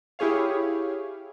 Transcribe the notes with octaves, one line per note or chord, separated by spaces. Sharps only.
E4 G4 G#4 C#5 F5